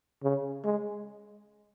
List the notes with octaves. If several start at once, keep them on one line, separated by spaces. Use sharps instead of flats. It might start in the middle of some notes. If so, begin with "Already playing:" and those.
C#3
G#3